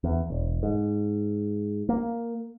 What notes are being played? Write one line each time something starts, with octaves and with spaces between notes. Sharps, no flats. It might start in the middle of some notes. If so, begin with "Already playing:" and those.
E2
E1
G#2
A#3